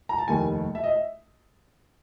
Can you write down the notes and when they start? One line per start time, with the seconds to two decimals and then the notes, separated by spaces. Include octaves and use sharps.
0.09 A#5
0.18 A5
0.28 F1 D#2 D#3 G3 G#5
0.75 E5
0.84 D#5
0.92 E5